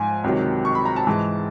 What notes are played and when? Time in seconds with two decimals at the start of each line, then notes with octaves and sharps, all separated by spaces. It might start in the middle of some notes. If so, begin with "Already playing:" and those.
Already playing: G#2 F3 G#5
0.24 C#2 C3 D#3 F#3
0.65 C#6
0.75 B5
0.85 A#5
0.96 A5
1.06 G#2 E3 G#3